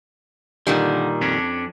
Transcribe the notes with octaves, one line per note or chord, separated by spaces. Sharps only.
A#2 D3 D#3 G3
F2 C#4 D4